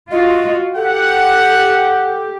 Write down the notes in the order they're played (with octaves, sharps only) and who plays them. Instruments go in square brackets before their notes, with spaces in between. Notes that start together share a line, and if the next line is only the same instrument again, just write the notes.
[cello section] F4 F#4 [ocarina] D#5
[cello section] G4 [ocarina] A4 [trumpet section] F#5